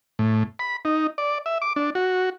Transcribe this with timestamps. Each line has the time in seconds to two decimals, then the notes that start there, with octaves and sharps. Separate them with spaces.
0.19 A2
0.59 B5
0.85 D#4
1.18 D5
1.46 E5
1.62 D6
1.76 D4
1.95 F#4